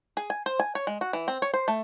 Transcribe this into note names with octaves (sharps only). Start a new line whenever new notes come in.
G#4
G#5
C5
G#5
C#5
G#3
F#4
E3
C4
C#5
C5
A3